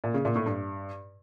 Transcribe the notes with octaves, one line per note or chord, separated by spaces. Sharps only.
A#2
C#3
A#2
A2
G2